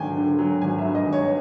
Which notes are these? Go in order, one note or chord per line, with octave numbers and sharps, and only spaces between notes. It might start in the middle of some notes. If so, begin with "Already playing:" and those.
Already playing: G#1 D3 F#3 G5 G#5
D3
F#3
G#1 G#5
E5
G2
D#5
G#1
C#5